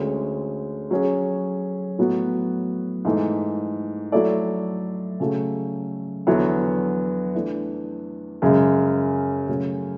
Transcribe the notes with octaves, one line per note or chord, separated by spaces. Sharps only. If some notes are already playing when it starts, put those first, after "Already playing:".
Already playing: D2 D3 G#3 C#4
F#3 C#4 G#4
A2 F#3 B3 F#4
G#2 E3 A3
F#3 A3 E4 A4 D5
C#3 F#3 A3
E2 D3 F#3 B3 E4
E3 A3 D4
F#2 C#3 G#3
C#3 F#3 A3 C#4